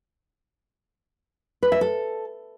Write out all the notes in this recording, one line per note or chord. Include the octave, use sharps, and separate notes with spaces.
B4
E5
A4